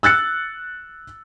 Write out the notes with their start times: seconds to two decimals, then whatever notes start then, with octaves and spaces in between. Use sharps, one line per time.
0.03 E6 F#6 A6 C#7